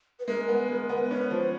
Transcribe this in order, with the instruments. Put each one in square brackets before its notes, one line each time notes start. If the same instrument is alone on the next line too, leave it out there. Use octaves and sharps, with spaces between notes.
[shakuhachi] B4
[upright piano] G#3 [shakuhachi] A#4
[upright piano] B3 [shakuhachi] B4
[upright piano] G#3 [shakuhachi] A#4
[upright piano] B3 [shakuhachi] B4
[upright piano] C#4 [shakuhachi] B4
[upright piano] F3 [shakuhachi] C5